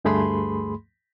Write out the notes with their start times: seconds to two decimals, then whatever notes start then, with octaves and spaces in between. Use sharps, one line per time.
0.05 D2 G2 A3 G#4 B5 C6